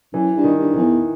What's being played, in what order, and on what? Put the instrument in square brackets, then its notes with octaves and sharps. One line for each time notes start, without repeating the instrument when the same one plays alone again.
[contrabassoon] F#2 [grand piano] E3
[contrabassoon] G2
[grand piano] D#3
[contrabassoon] G2
[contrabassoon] F2 [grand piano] E3
[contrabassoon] E2